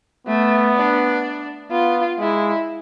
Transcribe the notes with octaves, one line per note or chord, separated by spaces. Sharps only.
A3 B3
D4
B3 F4
G#3 E4